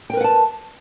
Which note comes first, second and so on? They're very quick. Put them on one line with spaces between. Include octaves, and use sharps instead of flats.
G5 A#4 B4 F#5 A5